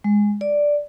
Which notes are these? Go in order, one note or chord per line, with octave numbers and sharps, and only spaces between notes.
G#3
D5